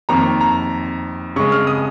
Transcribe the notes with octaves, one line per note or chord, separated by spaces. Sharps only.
F2 D#3 A#3 A#5
A#5
C#3 G#3 C#6
F6
D#6